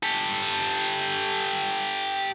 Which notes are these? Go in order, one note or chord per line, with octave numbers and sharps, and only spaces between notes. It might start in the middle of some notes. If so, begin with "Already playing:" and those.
G4 A4